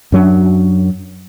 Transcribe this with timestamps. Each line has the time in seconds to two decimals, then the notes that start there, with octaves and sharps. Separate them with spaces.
0.12 F#2 F#3 D4